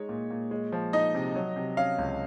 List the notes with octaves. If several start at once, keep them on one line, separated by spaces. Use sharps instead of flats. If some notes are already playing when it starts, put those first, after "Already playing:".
Already playing: G#3 D#4 C#5
A#2
A#2
G#3
F3
D#4 D#5
C3
F#3
C3
C#4 F5
C#2